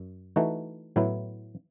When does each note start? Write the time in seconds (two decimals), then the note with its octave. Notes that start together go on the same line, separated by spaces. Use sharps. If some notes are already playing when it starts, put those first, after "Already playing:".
Already playing: F#2
0.36 E3 A3 D#4 F#4
0.96 A2 F#3 B3 E4